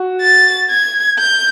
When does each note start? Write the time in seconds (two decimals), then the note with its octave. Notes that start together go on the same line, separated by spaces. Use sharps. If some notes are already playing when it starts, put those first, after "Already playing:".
Already playing: F#4
0.21 A6
0.70 G#6
1.19 G6